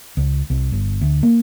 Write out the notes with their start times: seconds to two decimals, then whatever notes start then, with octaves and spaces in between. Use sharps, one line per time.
0.17 C#2
0.50 C2
0.72 G1
1.01 D2
1.23 A#3